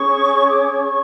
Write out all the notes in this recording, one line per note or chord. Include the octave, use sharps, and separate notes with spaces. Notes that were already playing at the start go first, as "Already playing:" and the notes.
Already playing: C#4 G#4 C#5 C#6
D6
D6
C#6
C#6